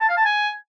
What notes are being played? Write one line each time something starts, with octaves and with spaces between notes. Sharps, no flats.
A5
F5
A5
G#5